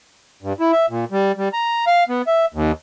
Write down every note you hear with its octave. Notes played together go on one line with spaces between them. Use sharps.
G2
E4
E5
A#2
G3
G3
A#5
F5
B3
E5
D#2